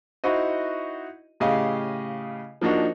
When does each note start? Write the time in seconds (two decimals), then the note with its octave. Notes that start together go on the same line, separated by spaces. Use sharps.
0.24 D#4 E4 F#4 C5 D#5
1.40 A2 C#3 G4 D#5 F5
2.61 F3 A#3 D4 D#4 F#4